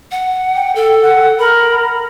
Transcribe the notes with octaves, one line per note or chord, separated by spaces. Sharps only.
F#5
G5
A4
F#5
A#4 B5